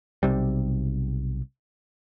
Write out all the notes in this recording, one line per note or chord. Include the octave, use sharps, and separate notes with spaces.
B1 C3 G3